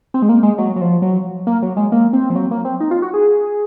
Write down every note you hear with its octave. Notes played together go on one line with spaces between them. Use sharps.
C4
G#3
A#3
G#3
F#3
F#3
F3
F#3
A#3
F#3
G#3
A#3
C4
F3
F#3
A#3
C4
D#4
F4
F#4
G#4